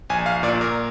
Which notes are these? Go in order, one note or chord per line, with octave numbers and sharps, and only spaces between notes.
A#1 G#5
F5
A#2 D5
A#4